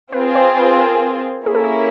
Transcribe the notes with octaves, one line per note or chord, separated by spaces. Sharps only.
C4 F4 G#4 B4
C5
B4
A#4
A#3 C#4 E4 G#4
A4
G#4